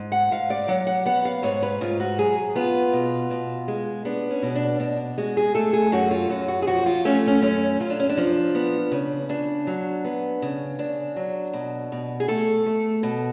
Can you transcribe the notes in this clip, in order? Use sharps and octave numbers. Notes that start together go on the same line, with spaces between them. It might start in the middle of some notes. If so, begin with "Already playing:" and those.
Already playing: G#2
F#5
G#2 F5
D5
F#3 F#5
F#5
B3 F#5
F5
G#2 C#5
B4
G#2 F4
F#4
F#3 G#4
B3 F4
B2
B2
G#3
B3 D4
C#4
B2
D4
B2 D4
G#3 F#4
G#4
A3 A4
G#4
F#2 F#4
F4
F#2 F#4
F#4
G#4
F3 F#4
F4
A3 C#4
C#4
F#2 C#4
F#2 F4
D4
C#4
D4
F3
B3
C#3
C#3 D4
F#3
B3
C#3
C#3 D4
F#3
B2
B2
G#4
A3 A4
A3
B2